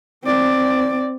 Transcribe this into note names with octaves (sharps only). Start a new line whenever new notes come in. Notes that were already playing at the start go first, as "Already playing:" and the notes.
C4 D5